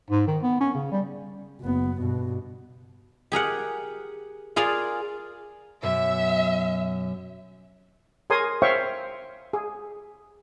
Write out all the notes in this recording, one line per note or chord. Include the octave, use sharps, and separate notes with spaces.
G#2
D#3
B3
C#4
C#3
G3
F#1 B3
G2 B2
G4 G#4 A#4 F#5
F4 G#4 A#4 D5 F5
F#2 B2 E5
G#4 A#4 C#5 G#5 C6 D#6
C5 C#5 E5 F5 G5 C#6
G#4